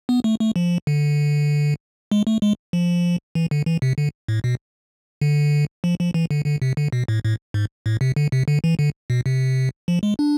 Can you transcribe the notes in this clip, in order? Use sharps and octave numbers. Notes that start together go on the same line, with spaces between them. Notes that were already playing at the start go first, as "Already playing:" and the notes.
B3
A3
A3
F3
D3
G#3
A3
G#3
F3
E3
D3
E3
C3
D3
A2
B2
D3
F3
F3
E3
D3
D3
C3
D3
B2
A2
A2
G#2
A2
C3
D3
C3
D3
E3
D3
B2
C3
F3
G#3
D4